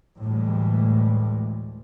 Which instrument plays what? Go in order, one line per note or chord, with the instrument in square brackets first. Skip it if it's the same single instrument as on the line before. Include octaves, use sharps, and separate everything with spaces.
[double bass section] D2 A2 E3 G3 G#3